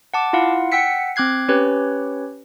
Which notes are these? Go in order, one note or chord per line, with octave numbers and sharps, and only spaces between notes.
F#5 A5 D6
E4 F4 F5 F#5
F#5 G5 E6 B6 C#7
C4 D6 F#6 G#6 C7
C#4 G4 B4 C#5